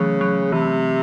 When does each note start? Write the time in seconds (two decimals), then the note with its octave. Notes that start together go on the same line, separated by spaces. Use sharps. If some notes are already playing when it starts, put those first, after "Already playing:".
Already playing: C#3 E3 F#3 A3
0.21 F#3
0.52 C3 E3